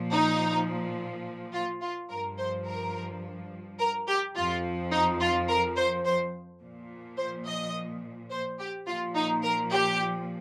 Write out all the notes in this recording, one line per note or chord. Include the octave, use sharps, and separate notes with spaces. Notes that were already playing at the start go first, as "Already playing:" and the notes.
Already playing: A#2 F3
D#4
F4
F4
G2 F3 A#4
C5
A#4
A#4
G4
F2 F3 F4
D#4
F4
A#4
C5
C5
A#2 F3
C5
D#5
C5
G4
A#2 F3 F4
D#4
A#4
G4